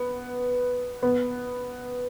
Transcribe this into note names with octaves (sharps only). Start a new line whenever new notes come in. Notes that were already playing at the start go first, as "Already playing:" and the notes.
Already playing: B3
B3